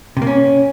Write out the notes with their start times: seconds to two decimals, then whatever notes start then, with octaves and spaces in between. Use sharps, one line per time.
0.17 C3
0.22 A#3
0.27 C#4